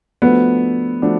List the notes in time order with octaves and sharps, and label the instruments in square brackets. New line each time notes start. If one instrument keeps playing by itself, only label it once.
[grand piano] F3 A3 D4 F#4 [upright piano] B3
[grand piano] F3 A3 D4 F#4